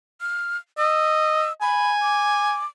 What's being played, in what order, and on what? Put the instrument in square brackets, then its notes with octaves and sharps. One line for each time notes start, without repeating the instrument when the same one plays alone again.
[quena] F6
[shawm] D#5 [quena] E6
[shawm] G#5 [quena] B5
[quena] D6